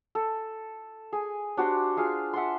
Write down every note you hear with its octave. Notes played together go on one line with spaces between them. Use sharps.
A4
G#4
D4 F#4 G4 C5
F4 G#4 F5
E5 F#5 A5 C6